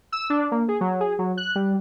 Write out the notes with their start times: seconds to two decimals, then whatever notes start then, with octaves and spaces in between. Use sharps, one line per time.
0.12 E6
0.30 D4
0.51 A#3
0.68 G#4
0.81 F#3
1.00 G#4
1.19 F#3
1.37 F#6
1.55 G3